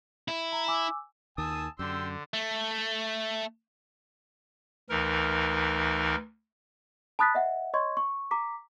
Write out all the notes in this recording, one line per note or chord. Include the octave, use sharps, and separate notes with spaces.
E4
A#5
G#5 D6 E6
D#2 D#3 G#5 A5 D#6 E6
F#2 D3 G4 C6 E6
A3
D2 E3 D#4 A#4
A5 B5 D#6 F#6 A6 B6
D#5 E5 F#5
C#5 D#5 C6 C#6 G#6
C#6
A#5 D6 B6